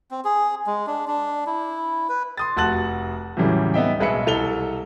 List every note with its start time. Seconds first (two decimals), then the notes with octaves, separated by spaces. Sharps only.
0.11 C4
0.25 G#4
0.66 G#3
0.87 D4
1.07 D4
1.47 E4
2.09 B4
2.37 C6 D#6 A6
2.57 F1 F#4 A5 F#6 A6 F#7
3.37 E2 A2 C#3 F#3 G3 A3
3.74 B3 D#4 E5 G5
4.00 B1 G#3 B4 E5 C#7
4.26 C2 A4 F7 G7